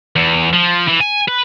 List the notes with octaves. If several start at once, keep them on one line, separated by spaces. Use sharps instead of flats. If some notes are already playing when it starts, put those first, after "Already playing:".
E2
F3
E3
G#5
B4